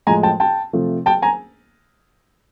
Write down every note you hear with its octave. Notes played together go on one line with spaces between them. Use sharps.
A2 F3 G#3 G#5 A#5
G5 A5
G5 A5
C3 F3 A3
G5 A5
G#5 A#5